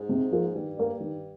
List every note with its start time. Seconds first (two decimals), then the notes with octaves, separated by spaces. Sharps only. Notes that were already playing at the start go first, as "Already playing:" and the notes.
Already playing: G#2
0.09 C3
0.32 F3 A#3 F4 G#4
0.55 G2 D#3
0.77 A#3 D4
1.00 D#3